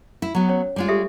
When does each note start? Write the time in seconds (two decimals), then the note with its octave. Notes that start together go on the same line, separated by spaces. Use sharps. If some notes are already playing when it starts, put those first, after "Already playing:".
0.22 E4
0.35 F#3 B3
0.49 C#4 C#5
0.76 G3 G#3 F4
0.88 G4 A4 E5